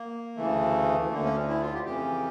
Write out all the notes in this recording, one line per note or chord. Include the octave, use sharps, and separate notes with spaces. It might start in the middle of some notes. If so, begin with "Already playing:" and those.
Already playing: A#3
D2 C#3 E3 A3
D2 D3 A#3
C#4
E4
F4
G4
F2 C#3 E3 G4